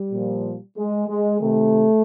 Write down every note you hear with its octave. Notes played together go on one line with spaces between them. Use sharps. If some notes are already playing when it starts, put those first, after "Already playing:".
Already playing: G3
A#2 F3
G#3
G#3
C3 D#3 A3